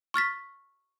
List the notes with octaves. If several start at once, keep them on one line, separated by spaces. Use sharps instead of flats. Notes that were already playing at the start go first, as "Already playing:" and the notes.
C#6 F6 A6 B6